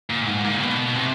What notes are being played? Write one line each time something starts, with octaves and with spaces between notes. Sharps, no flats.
A#2
A2
G#2
A#2
B2
C3